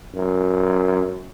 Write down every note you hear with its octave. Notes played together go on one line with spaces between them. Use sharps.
F#2